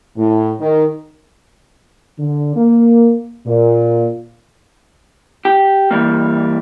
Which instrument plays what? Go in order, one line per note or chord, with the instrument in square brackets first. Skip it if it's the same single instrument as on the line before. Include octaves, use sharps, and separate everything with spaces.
[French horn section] A2
D#3
D3
A#3
A#2
[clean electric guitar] G4
E3 G3 A#3